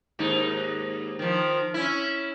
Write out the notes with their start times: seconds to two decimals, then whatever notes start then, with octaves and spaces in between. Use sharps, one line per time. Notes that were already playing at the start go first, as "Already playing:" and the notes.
0.19 D#2 G#2 D#4
1.19 D#3 F3
1.74 C#4 E4